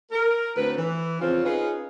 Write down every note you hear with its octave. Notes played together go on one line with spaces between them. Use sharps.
A#4
D2 A2 C4 B4
E3
F2 C#3 C4 F4 C#5
C#4 D#4 F4 G#4 B4